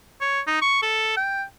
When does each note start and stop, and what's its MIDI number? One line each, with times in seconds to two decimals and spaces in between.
0.21 0.41 73
0.47 0.60 63
0.62 0.81 85
0.82 1.15 69
1.17 1.44 79